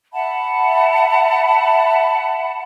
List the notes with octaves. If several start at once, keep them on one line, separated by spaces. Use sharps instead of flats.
E5 F#5 A5 B5